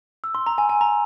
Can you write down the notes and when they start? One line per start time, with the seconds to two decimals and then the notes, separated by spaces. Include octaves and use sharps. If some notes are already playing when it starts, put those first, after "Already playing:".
0.24 E6
0.35 C6
0.47 A#5
0.58 G#5
0.69 G#5
0.81 A#5